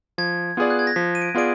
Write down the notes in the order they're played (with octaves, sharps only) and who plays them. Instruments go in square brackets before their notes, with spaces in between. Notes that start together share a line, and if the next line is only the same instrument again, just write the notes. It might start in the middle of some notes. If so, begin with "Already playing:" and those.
[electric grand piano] F3 [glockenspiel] G#6
[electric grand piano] B3 F4 G#4 D5
[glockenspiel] F#6
G#6
A#6
[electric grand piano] F3 [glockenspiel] B6
[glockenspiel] D#7
D7
[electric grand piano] B3 F4 G#4 D5 [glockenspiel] D7